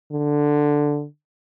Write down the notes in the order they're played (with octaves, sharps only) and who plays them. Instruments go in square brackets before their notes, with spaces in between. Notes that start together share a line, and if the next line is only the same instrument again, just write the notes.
[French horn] D3